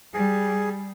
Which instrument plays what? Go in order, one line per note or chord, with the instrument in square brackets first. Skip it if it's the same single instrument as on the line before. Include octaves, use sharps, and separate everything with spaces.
[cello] G3 [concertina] G#4